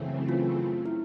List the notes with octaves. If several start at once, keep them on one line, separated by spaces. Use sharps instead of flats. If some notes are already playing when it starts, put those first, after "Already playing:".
Already playing: F#2 C#3 E3 A3 C4
F4
E4